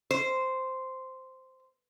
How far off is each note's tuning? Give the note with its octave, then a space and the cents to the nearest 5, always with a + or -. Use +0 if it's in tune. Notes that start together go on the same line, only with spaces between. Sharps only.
C5 -5